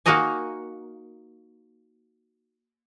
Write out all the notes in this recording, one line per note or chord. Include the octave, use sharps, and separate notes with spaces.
A#3 D#4 F#4 A#4 D#5 G#5